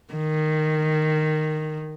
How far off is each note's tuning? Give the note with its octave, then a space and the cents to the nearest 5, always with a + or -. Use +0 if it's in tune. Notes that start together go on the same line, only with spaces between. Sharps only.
D#3 -10